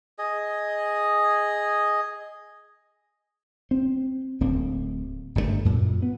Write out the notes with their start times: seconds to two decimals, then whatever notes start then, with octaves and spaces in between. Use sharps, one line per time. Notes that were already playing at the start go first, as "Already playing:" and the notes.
0.19 G#4 D#5
3.71 C4
4.41 D1 D2 A#3 C4
5.35 G1 G2 C3 A3
5.65 F#2 A#2
6.02 B3